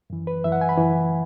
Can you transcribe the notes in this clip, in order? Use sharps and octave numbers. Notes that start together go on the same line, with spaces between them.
F#2 E3
B4
F#2 E3 E5
F#5
G#5
B5
F#2 E3